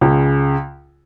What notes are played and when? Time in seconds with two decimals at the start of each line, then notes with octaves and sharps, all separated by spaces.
0.01 C#2 C#3